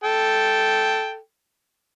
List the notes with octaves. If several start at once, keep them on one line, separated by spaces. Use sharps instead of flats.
A4 G5